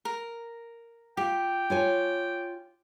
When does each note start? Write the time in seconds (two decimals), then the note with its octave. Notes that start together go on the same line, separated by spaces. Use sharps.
0.05 A#4
1.17 F4 G4 G5
1.70 F4 C#5 G#5